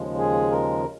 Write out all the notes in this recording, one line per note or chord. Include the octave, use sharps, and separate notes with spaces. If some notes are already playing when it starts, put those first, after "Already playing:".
Already playing: D#2 C#3 F3 G#3
G#4
A#4